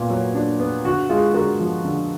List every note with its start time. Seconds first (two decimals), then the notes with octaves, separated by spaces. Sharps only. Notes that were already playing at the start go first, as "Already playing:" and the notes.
Already playing: A#2 B3
0.10 F#3
0.35 D4
0.60 B3
0.85 D3 F#4
1.09 G#3 F4 G#4
1.34 D3 F#4 A#4
1.59 F3
1.85 D3